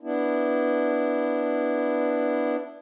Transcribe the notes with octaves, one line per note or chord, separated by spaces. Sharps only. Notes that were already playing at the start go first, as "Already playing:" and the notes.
B3 D4 E4